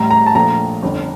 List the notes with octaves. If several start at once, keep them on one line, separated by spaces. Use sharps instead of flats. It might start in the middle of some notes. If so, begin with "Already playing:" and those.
Already playing: A1 A2 G3 A#5
A#5
A5
A#1 A#2 F3 A3 A#5
G1 F2 D3